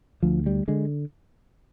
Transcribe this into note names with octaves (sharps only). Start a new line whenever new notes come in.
D2 F3
G3
D3 G#3